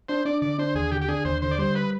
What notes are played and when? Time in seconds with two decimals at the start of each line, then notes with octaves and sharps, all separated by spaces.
0.09 D4 C5
0.25 D4 D5
0.42 D3 D5
0.59 D4 C5
0.75 D#2 G#4
0.91 D3 G4
1.01 G4
1.09 D4 G#4
1.25 D#2 C5
1.42 D3 C5
1.51 D5
1.59 G3 C5
1.75 B4